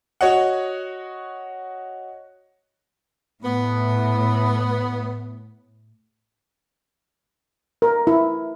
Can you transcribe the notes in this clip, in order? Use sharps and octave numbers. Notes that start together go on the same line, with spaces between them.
F#4 C#5 D#5 F#5
A2 B3
A#4
E4